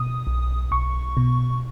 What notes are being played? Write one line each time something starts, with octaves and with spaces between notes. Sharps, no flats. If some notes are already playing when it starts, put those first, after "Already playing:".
Already playing: B2 D#6
B1
B1 C#6
B2